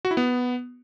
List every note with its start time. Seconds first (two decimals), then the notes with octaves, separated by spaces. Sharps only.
0.05 F#4
0.11 E4
0.17 B3